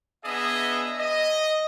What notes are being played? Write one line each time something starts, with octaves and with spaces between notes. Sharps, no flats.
B3 D4 G#4 D#5 E5
D#5